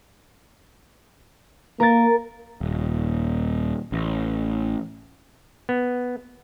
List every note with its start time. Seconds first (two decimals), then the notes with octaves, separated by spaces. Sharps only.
1.80 A#3 A#4 A6
2.61 D#1
3.92 A1
5.69 B3